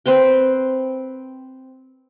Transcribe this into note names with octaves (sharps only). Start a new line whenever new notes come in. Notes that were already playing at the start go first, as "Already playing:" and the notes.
C4 B4 C5 G5